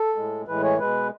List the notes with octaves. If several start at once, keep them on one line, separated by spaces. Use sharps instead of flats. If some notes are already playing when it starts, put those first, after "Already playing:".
Already playing: A4
A2 G#3
A2 E3 G#3 B4
C#5
B2 G#3 B4